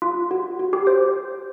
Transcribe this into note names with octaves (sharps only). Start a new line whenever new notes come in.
F4
F#4
F#4
G4
C5